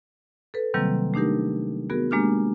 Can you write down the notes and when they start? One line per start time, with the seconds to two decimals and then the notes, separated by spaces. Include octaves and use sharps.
0.54 A4 B4
0.74 C3 D#3 F#3 G3 A#3 C4
1.14 A3 D4 D#4 G4 A#4
1.90 B3 F#4 G#4 A#4
2.11 G#3 A#3 D4 G4 F6